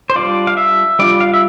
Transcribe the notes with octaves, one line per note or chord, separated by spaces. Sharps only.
C5
G3 D4 F4 D5
F5
E5
G3 D4 F4 D5
F5
E5